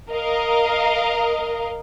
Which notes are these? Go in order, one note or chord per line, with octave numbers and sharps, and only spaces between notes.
A#4 D#5 F5